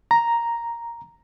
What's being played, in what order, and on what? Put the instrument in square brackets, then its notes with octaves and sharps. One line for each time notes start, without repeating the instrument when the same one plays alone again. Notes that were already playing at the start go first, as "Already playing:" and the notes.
[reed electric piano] A#5